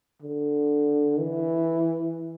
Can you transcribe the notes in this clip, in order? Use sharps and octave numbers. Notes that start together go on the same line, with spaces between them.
D3
E3